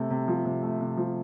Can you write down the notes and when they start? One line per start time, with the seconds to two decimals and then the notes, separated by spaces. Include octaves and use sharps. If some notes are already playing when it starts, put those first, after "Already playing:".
Already playing: C3 A3
0.10 C3
0.28 F3
0.45 C3
0.63 A3
0.81 C3
0.97 F3